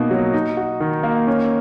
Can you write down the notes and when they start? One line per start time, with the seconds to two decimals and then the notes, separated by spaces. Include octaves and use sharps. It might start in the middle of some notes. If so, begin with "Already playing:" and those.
Already playing: B2 A#3 D#4
0.11 F#3
0.34 D#4
0.57 F#4
0.80 D#3
1.03 A#3
1.27 C#4